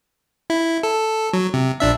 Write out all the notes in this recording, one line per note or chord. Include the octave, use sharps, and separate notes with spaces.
E4
A4
F#3
C3
A#1 D4 E5